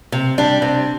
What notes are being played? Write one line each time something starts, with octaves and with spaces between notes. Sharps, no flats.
C3
G3 D4
C3